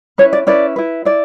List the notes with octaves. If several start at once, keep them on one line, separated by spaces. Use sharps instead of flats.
C#4 E4 B4 C#5
D5
C#4 E4 B4 D5
E4 B4
E4 D5